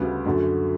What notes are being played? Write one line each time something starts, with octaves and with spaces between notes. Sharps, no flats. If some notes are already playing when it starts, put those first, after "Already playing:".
Already playing: D2 C#3 G3 B3
F#2 D3 A3